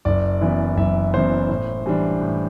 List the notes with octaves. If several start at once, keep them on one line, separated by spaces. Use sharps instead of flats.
F#1 D5
F#2 E3 B3 E4
F#1 E5
F#2 E3 B3 E4 C5
A2
E3 G3 D4
A2